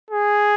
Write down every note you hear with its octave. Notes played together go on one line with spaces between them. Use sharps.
G#4